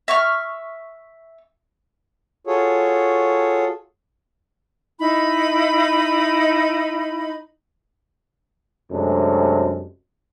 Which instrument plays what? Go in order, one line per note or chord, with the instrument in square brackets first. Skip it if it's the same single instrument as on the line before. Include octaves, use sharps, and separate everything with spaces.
[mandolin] E5 C#6 F6
[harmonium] F4 F#4 G#4 A4 C#5
[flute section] D#4 E4 B5
[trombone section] F#2 C3 G#3 A3 D4